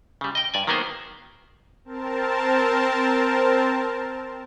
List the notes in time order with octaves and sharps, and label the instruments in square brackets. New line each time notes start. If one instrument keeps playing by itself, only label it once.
[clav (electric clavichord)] C#3 G3
D#5 G5
G2 D5 G#5
D#3 F#3 A#3 B3 G#4 C5
[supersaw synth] C4 A#4 A5